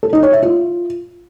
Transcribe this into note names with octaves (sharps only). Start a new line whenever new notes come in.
A4
D#4
C#5
E5
F4